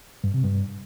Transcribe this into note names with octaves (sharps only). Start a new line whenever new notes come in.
G2
C3
G2